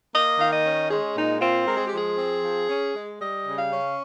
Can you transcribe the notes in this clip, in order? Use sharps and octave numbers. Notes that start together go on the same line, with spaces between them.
A#3 D#5
D#3 F5
D#5
C#4
G#3 G#4
A#2 D#4
C4 F4
G#3 A#4
G#4
G4
F3 G#4
C4
F3
C#4
G#3
G3 D#5
C#3
F5
C#4